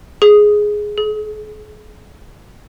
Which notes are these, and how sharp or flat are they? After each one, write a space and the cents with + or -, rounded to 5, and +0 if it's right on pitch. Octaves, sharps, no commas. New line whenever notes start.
G#4 +5
G#4 +45